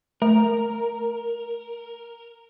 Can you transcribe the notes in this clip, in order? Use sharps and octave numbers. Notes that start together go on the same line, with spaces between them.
A3 A#4